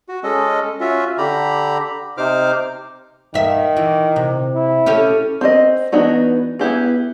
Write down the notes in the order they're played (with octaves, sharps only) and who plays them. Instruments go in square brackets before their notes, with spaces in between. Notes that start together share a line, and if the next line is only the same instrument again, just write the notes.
[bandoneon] F#4
G#3 C#4 A4 D#5
C#4 F4 F#4 E5
D3 G4 A#5 B5
C3 D#4 C5 D6 F6
[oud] G2 E5 [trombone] D#3
[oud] E3
C3
[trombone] E4
[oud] C#4 G4 A4
[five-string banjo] C4 C5 C#5 D#5
E3 B3 D4 D#4 F#4
B3 E4 G4 G#4